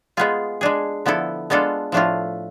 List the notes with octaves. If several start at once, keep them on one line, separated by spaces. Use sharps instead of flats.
G#3 B3 F4 G#4
G#3 D4 G#4
D3 F3 B3 E4 A4
G#3 B3 D4 F4 A4
A2 F3 A3 D4 F4